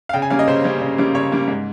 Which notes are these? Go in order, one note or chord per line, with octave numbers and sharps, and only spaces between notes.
F5
C#3 G5
G#5
G3 A#3 C#4 F5
D#5
C#3 C5
G3 A#3 C#4
C#3
G3 A#3 C#4
C#3 C#5
G3 A#3 C#4
G#2